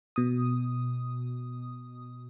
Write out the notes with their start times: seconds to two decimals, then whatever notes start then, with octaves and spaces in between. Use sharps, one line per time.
0.16 B2 D#6